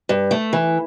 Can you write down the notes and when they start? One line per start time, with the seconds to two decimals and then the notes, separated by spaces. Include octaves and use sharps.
0.09 G2
0.31 A3
0.53 E3